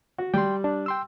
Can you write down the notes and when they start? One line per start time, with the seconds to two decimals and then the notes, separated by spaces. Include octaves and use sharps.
0.18 F#4
0.34 G3 G5 C6
0.64 D4
0.86 G5 C6 E6